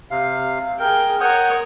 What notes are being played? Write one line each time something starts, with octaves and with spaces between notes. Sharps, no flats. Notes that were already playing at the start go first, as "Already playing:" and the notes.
C3 F5
G#4 A#4 G5
A#4 C#5 F#5 D#6 G6